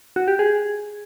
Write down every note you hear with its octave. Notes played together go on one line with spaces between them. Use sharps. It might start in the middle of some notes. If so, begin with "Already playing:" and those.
F#4
G4
G#4